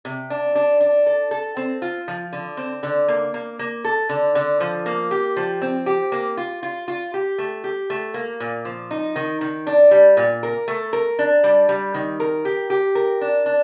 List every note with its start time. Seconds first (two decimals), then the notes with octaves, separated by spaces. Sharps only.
0.05 C3
0.30 D4
0.55 D4
0.81 D4
1.06 A4
1.31 A4
1.57 C4
1.82 F4
2.08 F3
2.33 D3
2.57 C4
2.83 D3
3.08 A#3
3.34 A#3
3.59 A#3
3.85 A4
4.09 D3
4.35 D3
4.60 F3
4.86 A#3
5.11 G4
5.36 F3
5.62 C4
5.86 G4
6.12 A#3
6.37 F4
6.63 F4
6.88 F4
7.14 G4
7.38 A3
7.64 G4
7.90 A3
8.14 A#3
8.40 A#2
8.65 F3
8.91 D#4
9.16 D#3
9.41 D#3
9.67 D4
9.91 G3
10.17 A#2
10.43 A#4
10.68 A3
10.93 A#4
11.19 D4
11.44 G3
11.69 G3
11.94 D#3
12.20 A#4
12.45 G4
12.70 G4
12.95 A#4
13.21 D4
13.46 D4